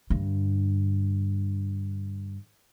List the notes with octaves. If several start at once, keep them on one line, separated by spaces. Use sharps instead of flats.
G2 D3